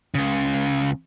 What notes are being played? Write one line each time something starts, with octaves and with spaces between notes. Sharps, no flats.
C#2 C#3